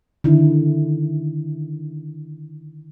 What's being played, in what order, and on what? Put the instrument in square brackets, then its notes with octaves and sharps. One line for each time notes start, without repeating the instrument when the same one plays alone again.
[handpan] D3 D#3 E4